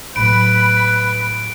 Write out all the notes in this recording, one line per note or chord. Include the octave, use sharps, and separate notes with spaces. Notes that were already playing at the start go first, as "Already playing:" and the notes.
A2 F#3 B4 B5 D7